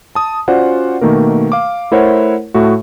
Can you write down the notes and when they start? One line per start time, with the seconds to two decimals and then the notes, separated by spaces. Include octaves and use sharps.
0.15 A5 D#6
0.48 C#4 F4 F#4 C5 D5 F#5
1.01 B2 D#3 A3 A#3 A#4
1.52 F5 D6
1.91 A3 E4 A#4 C5 C#5 F#5
2.54 A2 A3 F#4